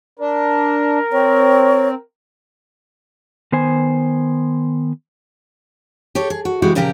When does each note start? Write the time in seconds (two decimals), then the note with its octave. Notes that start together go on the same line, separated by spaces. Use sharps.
0.19 D4 A#4
1.12 C4 C#5
3.52 D#3 B3 C5 G#5
6.15 G4 A4 C#5
6.30 G#4
6.45 F#4
6.62 C#3 E3 G#3 F#4 G4
6.75 A#2 C#3 F3 G4 A#4